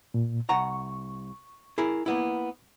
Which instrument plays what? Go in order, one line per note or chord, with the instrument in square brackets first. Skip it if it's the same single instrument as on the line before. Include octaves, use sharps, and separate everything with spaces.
[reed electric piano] A#2
[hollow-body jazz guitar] C2 F#5 A#5 [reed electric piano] C#6
[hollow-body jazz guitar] E4 G#4 A#4
A#3 B3 E4